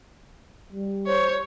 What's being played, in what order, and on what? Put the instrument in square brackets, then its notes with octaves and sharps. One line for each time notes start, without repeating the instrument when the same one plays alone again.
[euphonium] G3
[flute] C5 [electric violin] C#5